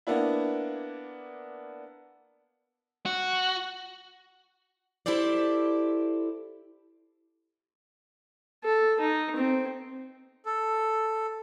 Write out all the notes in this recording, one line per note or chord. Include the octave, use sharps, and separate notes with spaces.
A#3 B3 D4 E4
F#4
E4 G4 A4 C5 D5
A4
D#4
C4
A4